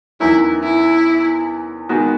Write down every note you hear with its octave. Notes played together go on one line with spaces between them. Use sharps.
E2 D#3 F#3 C#4 E4
E4
D#3 G#3 B3 F#4